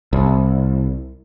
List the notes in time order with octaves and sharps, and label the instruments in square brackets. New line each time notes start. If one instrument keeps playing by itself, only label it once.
[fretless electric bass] C2